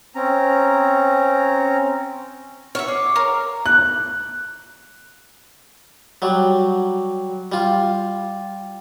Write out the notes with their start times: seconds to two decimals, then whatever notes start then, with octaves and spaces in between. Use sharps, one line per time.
0.15 C4 C#4 A#5
2.75 C#5 E5 F#5 F6
2.88 G#4 D6
3.16 A#4 F5
3.66 F#6
6.22 F#3 G3
7.52 G3 F4